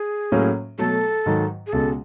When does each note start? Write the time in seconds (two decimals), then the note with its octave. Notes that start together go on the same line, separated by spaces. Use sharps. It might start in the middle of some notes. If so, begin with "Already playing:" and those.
Already playing: G#4
0.32 A2 F#3 A#3 C#4
0.79 B2 F#3 A3 A4
1.26 G#2 D#3 F#3
1.67 G#4
1.73 C#2 B2 G#3 A4